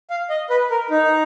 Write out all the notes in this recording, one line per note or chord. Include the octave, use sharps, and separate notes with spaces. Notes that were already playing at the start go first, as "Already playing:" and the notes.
F5
D#5
B4
A#4
D#4